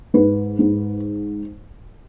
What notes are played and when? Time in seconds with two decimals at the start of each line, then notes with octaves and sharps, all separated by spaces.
0.14 G#2 B4
0.59 G#2